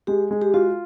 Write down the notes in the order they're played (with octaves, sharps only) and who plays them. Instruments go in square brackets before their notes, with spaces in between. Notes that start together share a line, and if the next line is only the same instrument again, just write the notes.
[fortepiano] G#3 [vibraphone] G4
[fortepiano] G#3
[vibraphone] G4
[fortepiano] F4 [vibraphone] F#4